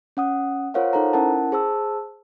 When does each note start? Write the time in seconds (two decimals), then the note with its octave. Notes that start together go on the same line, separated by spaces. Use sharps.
0.17 C#4 F#5 D#6
0.74 F4 A#4 C5 C#5 F5 F#5
0.93 D#4 A4 C5 A#5
1.13 C#4 E4 A#4 F#5 A5
1.52 G#4 C5 A5 E6